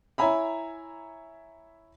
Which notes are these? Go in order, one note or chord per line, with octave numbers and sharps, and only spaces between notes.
E4 C#5 E5 G#5 A#5 B5